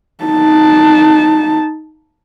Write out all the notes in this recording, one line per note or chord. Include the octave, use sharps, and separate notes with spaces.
D#4 A5